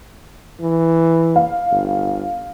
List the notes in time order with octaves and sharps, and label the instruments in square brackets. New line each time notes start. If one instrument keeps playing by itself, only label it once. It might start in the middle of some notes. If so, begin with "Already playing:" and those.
[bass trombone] E3
[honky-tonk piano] F5
[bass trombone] G1